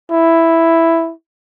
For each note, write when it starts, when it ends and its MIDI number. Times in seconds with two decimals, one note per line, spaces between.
0.11 1.13 64